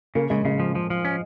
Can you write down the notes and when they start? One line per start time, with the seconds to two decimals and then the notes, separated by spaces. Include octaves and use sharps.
0.15 C#3 A#3
0.30 C#3 G#3
0.45 C#3 G#3
0.60 F3
0.75 F3
0.90 F3
1.05 C#4